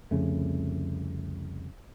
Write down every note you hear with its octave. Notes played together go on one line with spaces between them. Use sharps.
C2 F2 C#3 A3